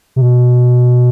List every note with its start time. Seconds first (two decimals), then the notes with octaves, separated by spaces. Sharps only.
0.16 C3
0.21 B2